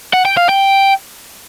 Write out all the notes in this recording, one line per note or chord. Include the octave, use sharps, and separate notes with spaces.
F#5
G5
F5
G5